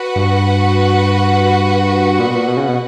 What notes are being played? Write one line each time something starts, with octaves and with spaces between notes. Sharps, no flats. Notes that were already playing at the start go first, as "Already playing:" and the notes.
Already playing: F#4 B4 F#5
G2
A#2
B2
A#2
B2
C#3
B2